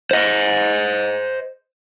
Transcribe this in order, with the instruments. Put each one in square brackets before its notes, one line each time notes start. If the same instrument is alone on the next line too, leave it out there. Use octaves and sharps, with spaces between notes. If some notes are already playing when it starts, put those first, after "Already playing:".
[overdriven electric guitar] C5 D#5